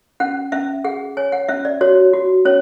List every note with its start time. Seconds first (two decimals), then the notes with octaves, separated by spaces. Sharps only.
0.20 C#4 F#5
0.52 C#4 E5
0.84 G#4 F#5
1.17 C#5 G#5
1.32 F#5
1.48 C#4 E5
1.65 D5
1.81 F#4 C#5
2.13 F#4
2.45 C#4 C#5